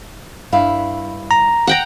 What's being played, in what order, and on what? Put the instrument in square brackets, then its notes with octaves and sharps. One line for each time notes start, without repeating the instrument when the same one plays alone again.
[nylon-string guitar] G2 E4 F5
[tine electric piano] A#5
[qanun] F#5 G5 A#5